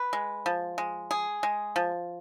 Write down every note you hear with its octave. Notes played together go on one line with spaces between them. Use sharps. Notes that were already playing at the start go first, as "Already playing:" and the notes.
Already playing: B4
G#3
F3
G#3
G#4
G#3
F3